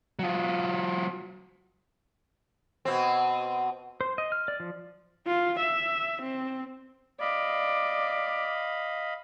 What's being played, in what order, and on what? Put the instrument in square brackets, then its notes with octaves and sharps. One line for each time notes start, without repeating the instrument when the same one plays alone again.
[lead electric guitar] F#3 F4
[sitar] B2 C4
[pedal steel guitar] C5
D#5
F6
D5
F3
[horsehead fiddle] F4
E5
C4
[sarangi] D5 [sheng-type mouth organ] D#5 F5 B5